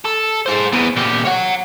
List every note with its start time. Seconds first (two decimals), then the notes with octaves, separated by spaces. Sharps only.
0.05 A4
0.46 G#4 C5
0.72 E3 B3
0.96 A#2 G4
1.25 C#5 F#5